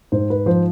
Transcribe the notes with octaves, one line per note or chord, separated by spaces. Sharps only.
G#2 C5
B4
F3 C5